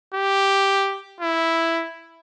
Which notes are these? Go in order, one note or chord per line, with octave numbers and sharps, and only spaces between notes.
G4
E4